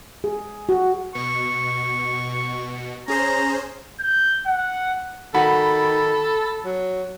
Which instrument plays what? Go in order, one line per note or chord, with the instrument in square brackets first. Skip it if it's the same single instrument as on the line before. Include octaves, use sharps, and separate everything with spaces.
[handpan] G#4
F#4
[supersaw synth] B2 [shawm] C#6
[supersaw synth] C#4 G#4 C5 [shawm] A#5
[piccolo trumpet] G6
F#5
[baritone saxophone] D#3 [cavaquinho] F#4 [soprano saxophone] A4 [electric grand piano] B5
[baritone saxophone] F#3